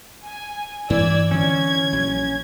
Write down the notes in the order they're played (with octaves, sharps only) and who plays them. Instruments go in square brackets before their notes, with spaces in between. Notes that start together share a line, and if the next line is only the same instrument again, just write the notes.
[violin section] G#5
[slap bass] G2 [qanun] E3 [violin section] D5 E6 G#6
[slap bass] D3 C4 [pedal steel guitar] C#4 [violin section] G#6
[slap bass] A#1 F#3